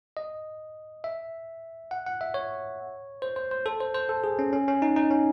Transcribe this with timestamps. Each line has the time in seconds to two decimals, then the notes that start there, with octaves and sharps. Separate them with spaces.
0.17 D#5
1.04 E5
1.91 F#5
2.06 F#5
2.21 E5
2.34 C#5
3.22 C5
3.36 C5
3.51 C5
3.66 A4
3.80 C5
3.94 C5
4.09 A4
4.24 G#4
4.39 C#4
4.53 C#4
4.68 C#4
4.82 D#4
4.96 D#4
5.11 C#4